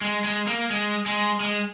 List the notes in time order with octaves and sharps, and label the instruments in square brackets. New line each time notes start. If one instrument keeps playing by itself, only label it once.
[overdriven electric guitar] G#3
G#3
A#3
G#3
G#3
G#3